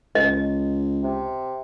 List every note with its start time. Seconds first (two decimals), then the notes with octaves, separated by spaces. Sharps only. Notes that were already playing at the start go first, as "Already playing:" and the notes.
0.15 C#2 D#5
1.03 C3